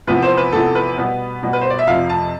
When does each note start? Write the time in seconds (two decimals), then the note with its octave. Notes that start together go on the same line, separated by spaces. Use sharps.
0.07 E2 C3 F3 B3 B4
0.22 C5
0.37 B4
0.52 E2 C3 F3 B3 A4
0.75 B4
0.97 B2 G3 B3 B4
1.43 B2 G3 B3
1.53 B4
1.61 C5
1.70 D5
1.79 E5
1.87 F2 C3 F3 F5
2.09 A5